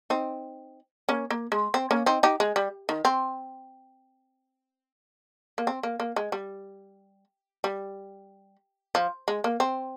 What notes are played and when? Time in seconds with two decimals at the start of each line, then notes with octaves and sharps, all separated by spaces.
0.10 C4 D#4
1.09 A#3 C#4
1.31 A#3
1.52 G#3
1.74 C4
1.91 A#3 C#4
2.06 C4 D#4
2.23 D#4 G4
2.40 G#3
2.56 G3
2.89 D#3
3.05 C4
5.58 A#3
5.67 C4
5.83 A#3
6.00 A#3
6.16 G#3
6.32 G3
7.64 G3
8.95 F3
9.28 G#3
9.44 A#3
9.60 C4